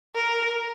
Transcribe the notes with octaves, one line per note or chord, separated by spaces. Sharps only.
A#4